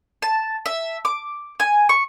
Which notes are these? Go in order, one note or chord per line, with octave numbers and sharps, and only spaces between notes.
A5
E5
D6
G#5
C#6